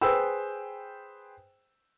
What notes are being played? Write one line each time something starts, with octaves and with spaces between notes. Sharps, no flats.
G#4 B4 C5 G5 E6